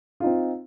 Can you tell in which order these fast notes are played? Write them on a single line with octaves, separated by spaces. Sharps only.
F4 D#4 C4